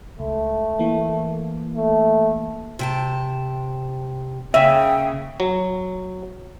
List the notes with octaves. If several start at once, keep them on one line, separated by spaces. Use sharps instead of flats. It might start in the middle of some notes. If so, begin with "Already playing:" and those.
C#2 A3
E3 A#3
A3
C3 G5 A5
C#3 A#3 C#4 E5 G5
F#3